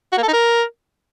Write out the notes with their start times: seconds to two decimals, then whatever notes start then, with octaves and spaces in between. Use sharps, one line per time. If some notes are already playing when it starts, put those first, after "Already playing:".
0.12 F#4
0.18 A#3
0.23 A4
0.28 D#4
0.33 A#4